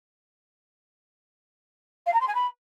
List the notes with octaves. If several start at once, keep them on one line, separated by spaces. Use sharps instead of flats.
F5
A#5
C6
G#5
B5